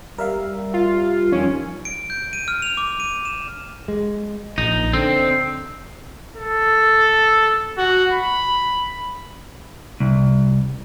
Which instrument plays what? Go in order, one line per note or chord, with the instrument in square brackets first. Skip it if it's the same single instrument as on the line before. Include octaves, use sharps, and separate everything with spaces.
[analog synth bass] G3 [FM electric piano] A#4 E5 F5
[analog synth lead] F4
[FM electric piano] F2 D#3 [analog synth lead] C#4
[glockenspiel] D7
G6
D#7
F6
F7
D6
D#7
E7
[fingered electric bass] G#3
[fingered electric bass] A#1 [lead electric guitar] D#4
[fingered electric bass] D3 [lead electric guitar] C4
[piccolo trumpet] A4
F#4
B5
[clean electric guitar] C2